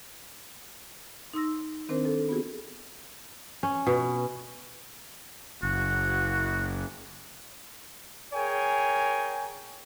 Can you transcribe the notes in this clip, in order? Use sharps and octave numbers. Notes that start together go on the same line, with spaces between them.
D#4 C6 E6 A#6
D#3 C4 D4 A#4 C5
A4
B3 F4 F#4 G#4
C#4
B2
F#1 F#4
G#4 A#4 C#5 G5 G#5